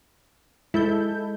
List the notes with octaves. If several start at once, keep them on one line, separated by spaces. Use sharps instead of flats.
G#3 E4 A4 G6